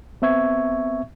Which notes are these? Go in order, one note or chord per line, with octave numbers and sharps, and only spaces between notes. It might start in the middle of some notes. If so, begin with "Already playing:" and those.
B3 C4 E5 C#6 G#6